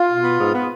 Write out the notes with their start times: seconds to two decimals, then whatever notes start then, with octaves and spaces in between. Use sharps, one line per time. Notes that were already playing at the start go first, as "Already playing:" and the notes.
Already playing: F4
0.08 B2
0.23 B3
0.39 G#2
0.54 B3